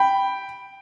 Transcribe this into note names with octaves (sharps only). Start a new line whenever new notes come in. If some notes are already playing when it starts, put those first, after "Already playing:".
Already playing: G5 B5